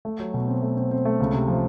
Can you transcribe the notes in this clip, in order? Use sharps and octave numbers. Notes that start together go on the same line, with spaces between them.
A3
F#3
B2
C4
A3
C4
C4
A3
C#2
C3
F3